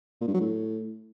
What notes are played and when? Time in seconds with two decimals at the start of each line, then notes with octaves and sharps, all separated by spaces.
0.21 A#2
0.28 G2
0.34 F#3
0.41 A2